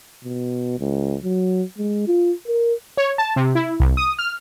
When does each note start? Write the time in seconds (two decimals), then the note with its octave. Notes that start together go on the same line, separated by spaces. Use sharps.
0.24 B2
0.79 C#2
1.24 F#3
1.78 G#3
2.07 F4
2.47 A#4
2.97 C#5
3.18 A5
3.36 C3
3.55 E4
3.80 C2
3.97 D#6
4.19 F6